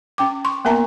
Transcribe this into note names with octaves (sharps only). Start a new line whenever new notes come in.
C#4 G5 D6
C6 C#6
A#3 B3 A#4 E5 A5 A#5